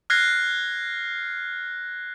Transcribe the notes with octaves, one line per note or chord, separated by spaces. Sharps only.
F6 F#6 G#6 A#6 C7